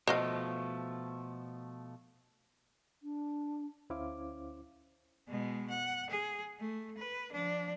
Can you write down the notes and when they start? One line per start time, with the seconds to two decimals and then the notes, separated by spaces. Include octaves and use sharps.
0.07 B2 F3 A3 C5 D#5 F5
3.02 D4
3.90 D2 C#4 E4 C5 F5 D6
5.28 B2 G#3
5.70 F#5
6.10 G#4
6.60 A3
6.98 B4
7.31 F3 D4